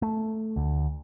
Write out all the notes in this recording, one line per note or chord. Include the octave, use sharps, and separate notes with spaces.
A3
D2